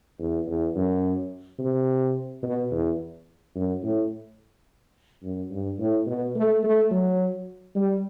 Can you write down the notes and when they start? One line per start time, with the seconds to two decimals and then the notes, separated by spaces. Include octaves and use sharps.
0.19 E2
0.47 E2
0.75 F#2
1.59 C3
2.43 B2
2.71 E2
3.55 F#2
3.83 A2
5.23 F#2
5.51 G2
5.79 A2
6.07 B2
6.36 A3
6.63 A3
6.91 F#3
7.75 G3